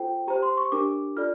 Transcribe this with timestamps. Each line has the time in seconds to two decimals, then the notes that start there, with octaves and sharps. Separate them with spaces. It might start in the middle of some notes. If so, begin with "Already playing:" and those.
Already playing: F4 A4 C5 G5
0.27 G4 C5 A#5
0.42 C6
0.57 C#6
0.72 D4 G4 A#4 D6
1.16 F4 A4 D5 F6